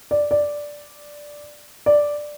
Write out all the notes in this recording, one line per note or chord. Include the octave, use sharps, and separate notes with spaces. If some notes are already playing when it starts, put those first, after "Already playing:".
D5
D5
D5